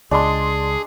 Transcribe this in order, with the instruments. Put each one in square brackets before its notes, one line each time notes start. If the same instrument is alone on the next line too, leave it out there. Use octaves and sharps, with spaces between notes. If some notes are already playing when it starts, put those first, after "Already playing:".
[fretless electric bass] C#2 [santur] G#3 D4 [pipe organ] G#4 [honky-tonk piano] D5 C6